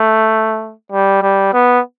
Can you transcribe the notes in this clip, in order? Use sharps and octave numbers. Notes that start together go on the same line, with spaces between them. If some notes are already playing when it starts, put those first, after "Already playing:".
Already playing: A3
G3
G3
B3